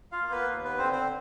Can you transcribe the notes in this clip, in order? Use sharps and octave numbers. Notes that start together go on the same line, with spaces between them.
F4 F5
A#3
B3 B4
D#2
B3 B4
D3 C4 C5
C4 C5